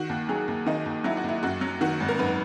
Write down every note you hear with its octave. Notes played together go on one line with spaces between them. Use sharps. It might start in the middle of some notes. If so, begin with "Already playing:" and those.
Already playing: D#3 F#4
D#2
F#3 G#4
D#2
D#3 D#4
D#2
F#3 E4
F#4
D#2
E4
F#2 F#4
F#3
D#3 F#4
G#1
A#4
F#2 B4